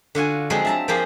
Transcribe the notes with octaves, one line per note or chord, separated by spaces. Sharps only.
D3 F4 F#4 G#5
F3 F#3 G#3 C4 G#4
E5 A5 A#5
F3 A#3 G4 G#4 C5